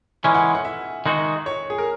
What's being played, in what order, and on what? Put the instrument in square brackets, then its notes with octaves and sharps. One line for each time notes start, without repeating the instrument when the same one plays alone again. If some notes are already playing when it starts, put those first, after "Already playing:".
[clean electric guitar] E3 G#3 C#4 [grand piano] G#5
[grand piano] F#5
F#5
E5
[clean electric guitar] D#3 G#3 D#4 F#4
[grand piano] C#5
G#4
A#4